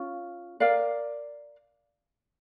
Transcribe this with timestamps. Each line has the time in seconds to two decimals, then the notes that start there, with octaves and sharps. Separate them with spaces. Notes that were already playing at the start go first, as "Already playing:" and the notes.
Already playing: C#4 F4
0.60 A#4 D5 F5